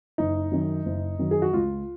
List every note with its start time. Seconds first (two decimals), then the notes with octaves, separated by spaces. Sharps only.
0.18 F#1 D#4
0.52 F#2 D#3 F#3
0.86 F#1
1.19 F#2 D#3 F#3
1.31 G#4
1.42 F#4
1.53 C#2 F4